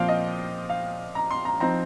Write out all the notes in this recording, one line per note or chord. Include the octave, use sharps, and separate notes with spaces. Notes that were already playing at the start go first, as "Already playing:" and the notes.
Already playing: A#2 F3 C4 F5 G5
D#5
F5
A#5
C6
A#5
F3 C4 D#4 A#5